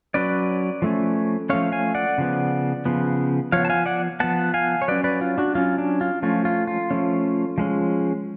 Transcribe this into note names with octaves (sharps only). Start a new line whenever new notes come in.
F#3 C#4 B4 D5
F3 A3 C#4
F3 A3 C#4 C#5 F5
F5 G#5
D5 F#5
C#3 F3 B3
C#3 F3 B3
F3 B3 C#5 F5
A5
F5 G#5
D5 F#5
F3 B3 F#5 A5
F5 G#5
C#5
F#3 C#4 B4 D5
B4 D5
F4
D4 F#4
F#3 C#4 F4
D4
F4
F3 A3 C#4 F4
F4
F4
F3 A3 C#4
F3 G#3 C#4